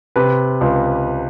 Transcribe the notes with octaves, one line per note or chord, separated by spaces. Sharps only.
C3 B4
C#2